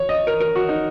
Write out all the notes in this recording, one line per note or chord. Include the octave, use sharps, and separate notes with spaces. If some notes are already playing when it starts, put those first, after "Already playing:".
Already playing: C#5
D#5
A#4
A#4
F#4
D#4